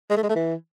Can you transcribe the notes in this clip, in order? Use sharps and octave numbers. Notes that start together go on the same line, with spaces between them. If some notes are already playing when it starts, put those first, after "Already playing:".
G#3
A3
G#3
A3
E3